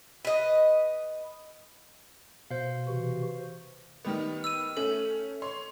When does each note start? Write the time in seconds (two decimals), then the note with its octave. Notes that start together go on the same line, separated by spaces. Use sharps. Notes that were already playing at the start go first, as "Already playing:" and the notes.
0.25 B4 D#5
2.51 B2 C5 F5
2.88 C3 E3 F#4
4.05 D#3 G3 B3
4.44 E6 D#7
4.77 A3 C#4 A4
5.42 C#5 C6